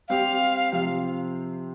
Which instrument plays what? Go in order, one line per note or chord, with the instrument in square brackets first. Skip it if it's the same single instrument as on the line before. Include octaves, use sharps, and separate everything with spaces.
[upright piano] G3 C4 G4 [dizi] F5
[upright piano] C3 F3 C4 [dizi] F5